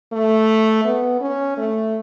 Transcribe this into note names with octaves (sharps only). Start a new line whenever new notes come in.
A3
B3
C#4
A3